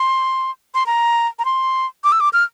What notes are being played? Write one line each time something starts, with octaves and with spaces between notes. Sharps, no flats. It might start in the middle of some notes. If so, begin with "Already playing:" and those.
Already playing: C6
C6
A#5
A#5
C6
D6
E6
D6
F6